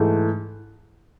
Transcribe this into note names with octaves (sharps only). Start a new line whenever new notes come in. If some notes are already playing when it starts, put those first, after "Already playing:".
Already playing: G#2 E3 A3